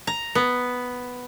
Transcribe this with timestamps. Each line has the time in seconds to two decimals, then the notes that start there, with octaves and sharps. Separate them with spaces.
0.07 A#5
0.35 B3